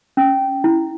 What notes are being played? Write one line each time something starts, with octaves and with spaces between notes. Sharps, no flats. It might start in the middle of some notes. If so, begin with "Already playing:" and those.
C#4
E4